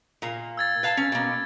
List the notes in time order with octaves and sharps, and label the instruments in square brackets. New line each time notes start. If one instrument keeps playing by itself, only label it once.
[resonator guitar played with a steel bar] A#2 A#3
[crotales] E6 G#6 A6
[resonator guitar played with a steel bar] B4 F5 A5
C#4
B2 A#3